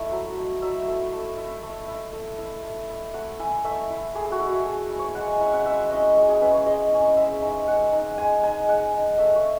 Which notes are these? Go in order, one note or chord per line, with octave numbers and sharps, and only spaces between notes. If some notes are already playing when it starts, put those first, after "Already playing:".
Already playing: A3 E4 E5
F#3
A3 E4
F#3 E5
A3 E4
A3
E4
A3
E4
A3
E4
A3
E4
A3 F#5
E4 G#5
A3 E5
E4
A3 G#4
G#4
F#4
E4
F#4
A3 G#4
E4
C#5
G#3 F#5
G#5
C#4 E4 F#5
F#5
G#3 E5
C#4 E4 D#5
G#3 C#5
G#4
C#4 E4 B4
C#5
G#3 D#5
C#4 E4
G#3 E5
D#4
G#3 F#5
D#4
G#3 G#5
D#4 G#5
G#3 F#5
D#4
A3 E5
C#5